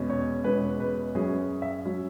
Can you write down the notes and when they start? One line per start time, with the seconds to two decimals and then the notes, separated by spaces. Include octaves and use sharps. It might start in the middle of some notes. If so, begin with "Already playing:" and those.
Already playing: E2 B2 G#3 C#4
0.10 C#5
0.44 E2 B2 G#3 C#4 B4
0.80 B4
1.15 F#2 F#3 C#4 G#4
1.62 E5
1.85 F#3 C#4